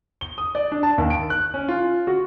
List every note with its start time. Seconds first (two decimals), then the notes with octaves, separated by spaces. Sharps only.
0.21 G7
0.38 D#6
0.55 D5
0.72 D4
0.83 A5
0.98 D#2
1.10 D7
1.30 F#6
1.54 C#4
1.68 F4
2.07 F#4